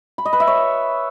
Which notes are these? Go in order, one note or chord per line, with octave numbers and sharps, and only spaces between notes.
B5
D#5
B4
E5
C#5